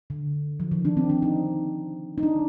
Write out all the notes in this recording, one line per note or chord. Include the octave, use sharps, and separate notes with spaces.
D3
F3
D#3
D4
C4
D4
D#4
D#4
D4